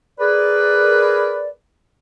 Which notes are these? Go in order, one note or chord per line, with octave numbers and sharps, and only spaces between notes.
G#4 A#4 B4 D5